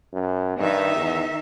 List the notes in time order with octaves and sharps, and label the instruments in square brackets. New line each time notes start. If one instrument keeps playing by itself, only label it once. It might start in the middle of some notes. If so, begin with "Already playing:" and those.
[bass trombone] F#2
[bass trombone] G2 [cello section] D#3 D#4 E5
[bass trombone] E2